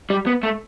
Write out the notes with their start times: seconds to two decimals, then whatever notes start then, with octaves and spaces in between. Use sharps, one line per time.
0.10 G3
0.26 B3
0.43 A3